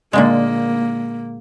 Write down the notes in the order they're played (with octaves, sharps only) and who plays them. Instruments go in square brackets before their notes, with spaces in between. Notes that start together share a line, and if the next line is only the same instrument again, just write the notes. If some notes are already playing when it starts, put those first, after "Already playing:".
[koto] A#2 D3 G#3 [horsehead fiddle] A#3